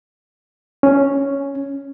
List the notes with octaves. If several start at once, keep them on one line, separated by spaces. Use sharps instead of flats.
C#4